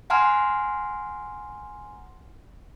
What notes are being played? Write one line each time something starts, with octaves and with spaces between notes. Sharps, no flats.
F#5 G#5 A#5 C6 F6